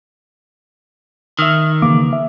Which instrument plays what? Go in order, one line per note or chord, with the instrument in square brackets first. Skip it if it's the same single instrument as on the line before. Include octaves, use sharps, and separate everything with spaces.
[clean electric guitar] D#3 [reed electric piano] E5 E6 F6
[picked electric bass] C#3 E3 A#3 [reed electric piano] D6
[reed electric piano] E5